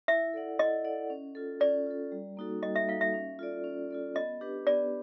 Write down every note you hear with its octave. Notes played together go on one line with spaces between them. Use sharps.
E4 E5
A4 D5 F#5
E4 D#5
A4 D5 F#5
C#4
F4 A4
C#4 D5
F4 A4
G3
A#3 D#4 F#4 A4
G3 D#5
E5
A#3 D#4 F#4 A4 F5
E5
C#4
F4 A4 D5
C#4
F4 A4 D5
B3 D#5
D4 G4 B4
B3 D5